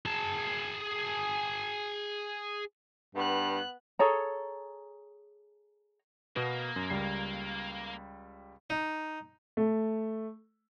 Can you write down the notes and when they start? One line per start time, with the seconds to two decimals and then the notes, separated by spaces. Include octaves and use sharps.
0.06 G#4 A5
3.15 G2 B3 F#6
3.99 G#4 A4 C#5 A#5
6.36 B2 A#3 B3
6.76 F#2
6.90 C#2 G3 C7
8.70 D#4
9.57 A3